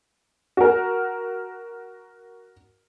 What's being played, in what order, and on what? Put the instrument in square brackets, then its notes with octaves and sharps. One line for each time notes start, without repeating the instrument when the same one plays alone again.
[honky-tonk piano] F#4 A#4